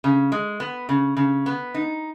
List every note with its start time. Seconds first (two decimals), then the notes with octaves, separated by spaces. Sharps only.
0.04 C#3
0.32 G#3
0.60 B3
0.89 C#3
1.17 C#3
1.46 B3
1.74 D#4